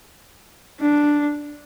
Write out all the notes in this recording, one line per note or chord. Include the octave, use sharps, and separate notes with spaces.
D4